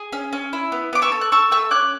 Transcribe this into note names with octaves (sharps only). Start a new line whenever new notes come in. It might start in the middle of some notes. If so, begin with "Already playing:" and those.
Already playing: G#4
C#4
C#4
E4
B3
B3 D6
C#6 E6
A4
F#6
A4 C#6 E6
A3 C#6 E6
C#4 D6 F#6